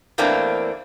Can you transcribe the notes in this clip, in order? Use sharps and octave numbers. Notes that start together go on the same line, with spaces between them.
E2 E3 A3 A#3 C4 D4